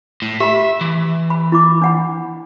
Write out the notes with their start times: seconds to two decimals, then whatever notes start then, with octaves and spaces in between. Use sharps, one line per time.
0.22 A2
0.40 G4 E5 B5
0.81 E3
1.30 B5
1.52 E4 B5 D6
1.82 D4 F#5 B5